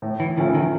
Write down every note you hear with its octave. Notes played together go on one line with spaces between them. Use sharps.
A2
E3
D#3 F3 A3 C#4 E4
D#3